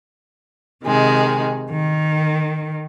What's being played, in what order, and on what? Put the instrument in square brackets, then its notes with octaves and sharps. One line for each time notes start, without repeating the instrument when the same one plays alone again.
[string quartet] C3 D#3 G#3
D#3